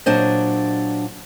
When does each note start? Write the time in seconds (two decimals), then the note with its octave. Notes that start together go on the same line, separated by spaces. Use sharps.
0.06 A#2 F#3 D4 C5 D#5